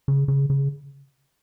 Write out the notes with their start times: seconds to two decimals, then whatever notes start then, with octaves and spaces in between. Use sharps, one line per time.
0.08 C#3
0.28 C#3
0.50 C#3